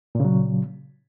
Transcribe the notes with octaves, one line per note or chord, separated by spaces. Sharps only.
A#2 C#3 F#3